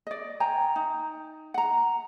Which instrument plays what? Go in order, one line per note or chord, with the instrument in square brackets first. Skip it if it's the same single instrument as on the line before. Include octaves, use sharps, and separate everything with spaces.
[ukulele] D5 D#5
C5 G5 G#5 A#5
D#4
F#5 A#5